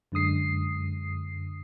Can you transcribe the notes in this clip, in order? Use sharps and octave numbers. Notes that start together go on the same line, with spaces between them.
F#2 D3 G#3 D#6 C7